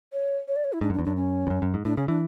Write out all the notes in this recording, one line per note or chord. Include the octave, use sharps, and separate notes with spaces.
C#5
C#5
D5
C#5
E4
G#2 D4
F#2
D4
E2
F#2 D4
C#4
E2
F#2
F#2
G#2
A2 D4
C#3 C#4
E3 D4